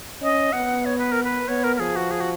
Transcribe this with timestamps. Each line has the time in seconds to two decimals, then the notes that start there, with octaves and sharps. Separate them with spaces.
0.21 C#4 D#5
0.53 B3 F#5
0.85 C#5
0.98 B4
1.12 A#4
1.24 B4
1.48 B3 C#5
1.64 A#4
1.76 A#4
1.79 F3 G#4
1.96 F#4
2.11 G#4
2.21 F#4